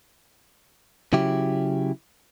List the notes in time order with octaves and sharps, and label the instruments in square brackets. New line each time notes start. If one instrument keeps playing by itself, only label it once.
[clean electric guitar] C#3 F#3 E4 G4